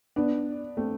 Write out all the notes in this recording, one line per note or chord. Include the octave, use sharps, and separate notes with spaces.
B3 D4
A3 C4